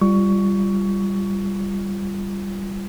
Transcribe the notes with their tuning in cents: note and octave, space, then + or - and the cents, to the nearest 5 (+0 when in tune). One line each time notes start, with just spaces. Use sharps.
G3 +0 F4 -20 C#6 +15